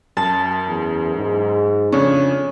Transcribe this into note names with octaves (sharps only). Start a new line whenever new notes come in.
F#2 A5
E2
G#2
F2 C#3 C#4 D4